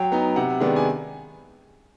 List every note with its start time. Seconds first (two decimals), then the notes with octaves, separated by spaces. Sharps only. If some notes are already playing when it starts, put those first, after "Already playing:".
Already playing: F#3 G5
0.12 B3 D#4
0.36 C3 F#5
0.60 D#3 G#3 B3 D4
0.76 G#5